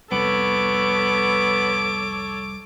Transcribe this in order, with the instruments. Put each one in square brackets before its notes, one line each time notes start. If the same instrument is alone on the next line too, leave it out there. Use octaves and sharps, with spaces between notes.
[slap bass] C2 F2 [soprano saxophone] B3 [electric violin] A4 C#5 [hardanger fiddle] D6